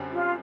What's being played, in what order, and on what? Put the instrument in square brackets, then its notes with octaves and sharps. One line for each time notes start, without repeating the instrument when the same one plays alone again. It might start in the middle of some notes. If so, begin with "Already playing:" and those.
Already playing: [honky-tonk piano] F#2 D3 G3 C4
[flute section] F4